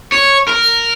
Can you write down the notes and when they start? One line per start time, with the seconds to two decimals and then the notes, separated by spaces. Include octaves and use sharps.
0.12 C#5
0.48 A#4